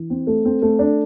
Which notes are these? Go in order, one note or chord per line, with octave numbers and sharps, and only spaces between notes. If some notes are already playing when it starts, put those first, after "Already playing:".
Already playing: E3
C4
A3
C4
A3
D4